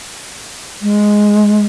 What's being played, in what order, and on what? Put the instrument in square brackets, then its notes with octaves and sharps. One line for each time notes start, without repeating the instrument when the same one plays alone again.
[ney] G#3